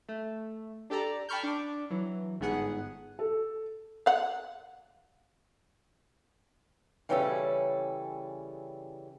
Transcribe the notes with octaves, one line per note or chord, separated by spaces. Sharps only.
A3
D4 G4 A4 D5 A#5
G5 A5 B5 C#6 F6 G6
D4 D6
E3 F#3
G1 G#2 B3 G#4 F#5
A4
F5 F#5
C#3 E3 G3 C#4 G#4 A4